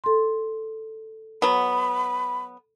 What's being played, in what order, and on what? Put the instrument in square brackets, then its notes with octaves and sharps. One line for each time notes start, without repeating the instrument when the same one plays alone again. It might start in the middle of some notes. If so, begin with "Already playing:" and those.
[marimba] A4 C6
[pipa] F#3 B3 [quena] B5